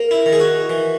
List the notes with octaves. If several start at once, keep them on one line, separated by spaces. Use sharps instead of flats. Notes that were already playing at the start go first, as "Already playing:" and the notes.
Already playing: A#3
E4
D#3
G#4
F#4
E3